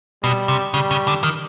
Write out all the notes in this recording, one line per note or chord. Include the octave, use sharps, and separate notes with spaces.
B2 G3
C3
C#3 G3
C#3
D3
D#3